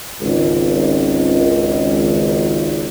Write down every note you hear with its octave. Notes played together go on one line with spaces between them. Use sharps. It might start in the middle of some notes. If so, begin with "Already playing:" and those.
G#1 C#2